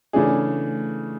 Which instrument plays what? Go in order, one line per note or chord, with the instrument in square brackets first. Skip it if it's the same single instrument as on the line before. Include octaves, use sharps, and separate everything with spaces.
[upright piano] C#3 E3 A3 D4 G#4